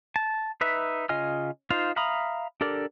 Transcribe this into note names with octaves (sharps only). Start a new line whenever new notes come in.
A5
D#4 B4 E5
C#3 F4 D#5 G#5 F6
D#4 F4 C5 F5
E5 F5 A#5 B5 D#6
D4 G4 A4 A#4 D5